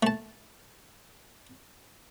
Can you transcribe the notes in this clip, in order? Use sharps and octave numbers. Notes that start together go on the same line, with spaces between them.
A3 A5